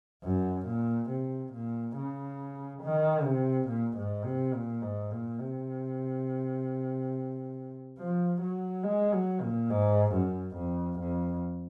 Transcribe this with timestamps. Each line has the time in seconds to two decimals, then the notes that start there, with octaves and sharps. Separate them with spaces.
0.24 F#2
0.67 A#2
1.10 C3
1.53 A#2
1.96 C#3
2.83 D#3
3.25 C3
3.68 A#2
3.97 G#2
4.25 C3
4.54 A#2
4.82 G#2
5.11 A#2
5.40 C3
7.98 F3
8.42 F#3
8.84 G#3
9.13 F#3
9.42 A#2
9.70 G#2
10.13 F#2
10.56 F2
10.99 F2